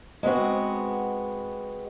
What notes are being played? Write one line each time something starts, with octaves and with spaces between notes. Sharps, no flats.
G#3 B3 C4 F#4